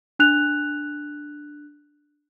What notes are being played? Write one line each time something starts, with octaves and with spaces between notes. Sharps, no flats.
D4 F#6 F7